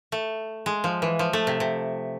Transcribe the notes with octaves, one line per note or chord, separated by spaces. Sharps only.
A3
G#3
F3
E3
F3
A3
C3
C3